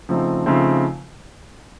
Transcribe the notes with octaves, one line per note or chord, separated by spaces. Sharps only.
C#3 F3 A3 C4 D#4
C#3 F3 A3 C4 D#4